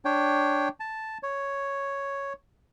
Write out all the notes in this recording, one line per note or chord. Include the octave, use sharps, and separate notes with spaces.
D4 C#5 G5
A5
C#5